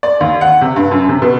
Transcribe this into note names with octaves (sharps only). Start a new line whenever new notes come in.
D5
D#2
F#5
C3
G2
F#2
C3
B2